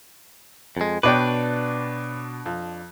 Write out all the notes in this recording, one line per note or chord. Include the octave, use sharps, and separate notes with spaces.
F2 G#3
B2 D4 B4 C#5 D5 G5 D6
F2